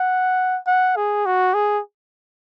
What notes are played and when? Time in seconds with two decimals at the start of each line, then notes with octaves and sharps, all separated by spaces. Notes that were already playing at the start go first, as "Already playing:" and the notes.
Already playing: F#5
0.67 F#5
0.96 G#4
1.26 F#4
1.54 G#4